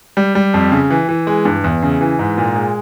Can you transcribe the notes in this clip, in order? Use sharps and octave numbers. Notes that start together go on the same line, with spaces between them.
G3
G3
F2
C#3
E3
E3
G#3
G2
E2
C#3
E3
G#2
A#2
G#3